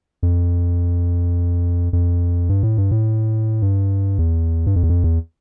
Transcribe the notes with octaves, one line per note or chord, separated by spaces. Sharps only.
F2
F2
G2
A2
G2
A2
G2
E2
G2
F2
E2
F2
E2